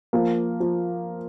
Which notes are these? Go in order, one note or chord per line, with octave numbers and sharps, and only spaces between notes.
F3 A#3
F3